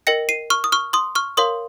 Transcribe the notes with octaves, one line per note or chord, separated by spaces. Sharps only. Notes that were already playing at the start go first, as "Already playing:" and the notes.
A#4 D#5 G5 A#6 C#7
C7 D#7
C#6 F6
D#6
C#6 F6
C6 D#6
C#6 F6
A#4 C#5 F5 C6 D#6